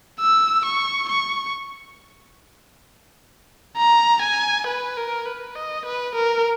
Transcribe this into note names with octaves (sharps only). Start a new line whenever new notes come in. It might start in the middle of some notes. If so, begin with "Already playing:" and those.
E6
C#6
C#6
A#5
G#5
B4
A#4
B4
D#5
B4
A#4